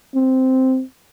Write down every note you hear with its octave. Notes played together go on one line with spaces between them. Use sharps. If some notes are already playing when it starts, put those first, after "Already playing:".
C4